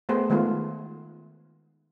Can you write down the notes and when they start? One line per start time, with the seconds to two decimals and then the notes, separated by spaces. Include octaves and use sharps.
0.09 A3 B3 G#4 C5
0.30 D#3 G#3 A3 B3 F4